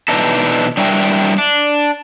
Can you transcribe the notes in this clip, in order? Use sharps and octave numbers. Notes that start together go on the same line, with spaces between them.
B2 E3 D4 D#4 A4
G3 D4 E4 F#4 A#4 G5
D4